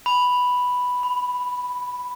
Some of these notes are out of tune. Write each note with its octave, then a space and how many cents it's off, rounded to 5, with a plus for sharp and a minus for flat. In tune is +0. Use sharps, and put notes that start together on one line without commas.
B5 +0
B5 +30